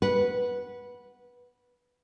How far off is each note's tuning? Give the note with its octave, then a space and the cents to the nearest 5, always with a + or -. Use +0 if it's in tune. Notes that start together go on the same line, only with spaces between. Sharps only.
B4 -15 F#5 +0